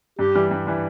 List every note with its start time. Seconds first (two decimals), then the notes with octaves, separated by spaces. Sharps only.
0.19 G2 G4
0.35 E3 G3
0.51 G2
0.67 E3 G3